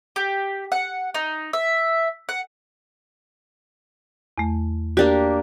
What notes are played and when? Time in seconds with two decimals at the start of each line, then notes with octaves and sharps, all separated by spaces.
0.16 G4
0.72 F#5
1.15 D#4
1.53 E5
2.29 F#5
4.38 E2 A3
4.97 A#3 D4 F#4 G4